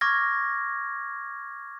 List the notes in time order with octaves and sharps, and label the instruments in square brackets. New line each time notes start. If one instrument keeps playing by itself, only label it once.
[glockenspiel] C#6 D6 F6 G#6 A#6